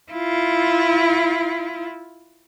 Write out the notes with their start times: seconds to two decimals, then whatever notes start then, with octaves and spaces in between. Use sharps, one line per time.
0.12 E4 F4